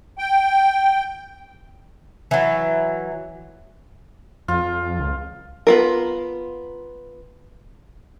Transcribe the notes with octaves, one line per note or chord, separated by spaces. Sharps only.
G5
E3 F#3
F2 F4
C#2
B3 F4 A#4